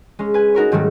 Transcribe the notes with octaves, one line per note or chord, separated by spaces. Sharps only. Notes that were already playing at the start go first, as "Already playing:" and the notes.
G#3 C#4
B4 G#5
D#4 F#4 A#4 C#5
G#2 D#3 F#3 G3 A3